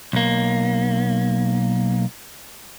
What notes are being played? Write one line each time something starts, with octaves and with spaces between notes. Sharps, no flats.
B1 A#3